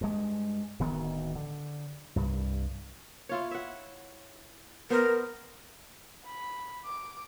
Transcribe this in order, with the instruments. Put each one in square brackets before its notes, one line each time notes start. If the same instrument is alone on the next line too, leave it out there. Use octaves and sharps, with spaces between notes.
[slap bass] G2 G#3
D1 D2 D#3 B3
D3
C2 G2
[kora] E4 F4 C#5
E5 F#5
[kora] B3 C5 [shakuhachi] A#4
[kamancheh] B5
D6